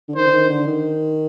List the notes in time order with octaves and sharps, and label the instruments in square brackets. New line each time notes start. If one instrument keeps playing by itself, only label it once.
[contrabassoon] D3
[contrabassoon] D#3 [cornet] C5
[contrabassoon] D3
D#3
D3
D#3